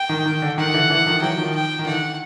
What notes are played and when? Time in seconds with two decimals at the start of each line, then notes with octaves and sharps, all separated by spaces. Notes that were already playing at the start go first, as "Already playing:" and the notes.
Already playing: G5
0.09 D#3
0.26 D#3
0.42 D3
0.58 D#3 F#5
0.74 D3 E3
0.90 D3 E3
1.06 D#3 F3
1.22 E3 F#3 G5
1.38 D#3 F3
1.54 G5
1.79 D#3
1.86 D3 E3 F#5